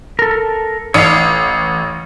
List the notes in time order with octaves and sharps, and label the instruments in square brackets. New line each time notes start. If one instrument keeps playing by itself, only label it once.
[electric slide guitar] A4 A#4
[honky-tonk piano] A1 [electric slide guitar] C#5 F5